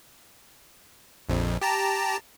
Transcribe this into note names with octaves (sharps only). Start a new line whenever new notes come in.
A#1 F2
G4 A5 A#5